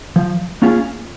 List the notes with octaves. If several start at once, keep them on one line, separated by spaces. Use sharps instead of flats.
F3
A#3 C#4 F4 G#4